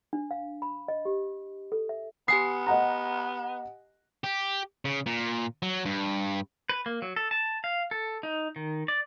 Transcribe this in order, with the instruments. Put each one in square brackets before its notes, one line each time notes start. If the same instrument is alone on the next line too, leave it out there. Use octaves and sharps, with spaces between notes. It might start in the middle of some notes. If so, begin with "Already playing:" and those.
[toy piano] D4
F5
B5
D#5
G4
A4
E5
[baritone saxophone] B3 [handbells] G4 G#5 D#6 [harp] C7
[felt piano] D#5 F#5 A#5
[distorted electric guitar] G4
C#3
A#2
F#3
G2
[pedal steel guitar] B4
A#3
F#3
A4
A5
F5
A4
D#4
D#3
D5